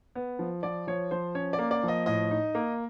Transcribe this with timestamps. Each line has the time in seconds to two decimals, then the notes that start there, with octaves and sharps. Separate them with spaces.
0.15 B3
0.39 F3
0.63 F3 D5
0.87 F3 C#5
1.11 F3 C5
1.35 C#4 C#5
1.53 D5
1.59 A#3
1.71 D5
1.83 F3 D#5
2.06 A2 D#5
2.31 D#4
2.55 A#3